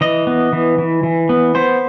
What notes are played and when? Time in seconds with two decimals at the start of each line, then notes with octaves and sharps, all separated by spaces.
0.01 E3 D#5
0.27 B3
0.53 E3
0.78 E3
1.03 E3
1.29 B3
1.55 B3 C5